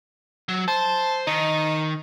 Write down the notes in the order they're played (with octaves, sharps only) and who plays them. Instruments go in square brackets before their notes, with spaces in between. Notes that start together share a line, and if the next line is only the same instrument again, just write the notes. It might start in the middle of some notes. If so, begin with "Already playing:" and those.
[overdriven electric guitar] F#3
[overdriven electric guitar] C5 [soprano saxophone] A5
[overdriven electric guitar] D#3 [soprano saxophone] D#4